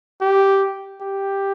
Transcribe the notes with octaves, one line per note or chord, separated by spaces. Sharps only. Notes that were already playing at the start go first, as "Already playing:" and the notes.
G4
G4